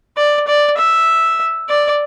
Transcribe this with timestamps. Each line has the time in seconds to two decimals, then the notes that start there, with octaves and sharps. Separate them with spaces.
0.17 D5
0.48 D5
0.78 E5
1.69 D5